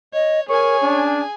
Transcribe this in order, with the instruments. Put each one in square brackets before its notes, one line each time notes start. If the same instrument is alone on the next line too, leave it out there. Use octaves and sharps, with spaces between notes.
[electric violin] C#5 [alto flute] D#5
[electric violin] G#4 G#5 [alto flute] A#4 [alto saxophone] C#5
[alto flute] C#4 [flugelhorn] D4